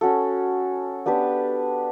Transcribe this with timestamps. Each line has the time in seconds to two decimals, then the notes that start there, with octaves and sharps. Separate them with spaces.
0.01 C#4 F#4 A4
1.06 B3 D4 G4 B4